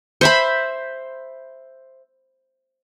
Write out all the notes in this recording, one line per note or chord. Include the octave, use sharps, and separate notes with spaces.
C5 E5 B5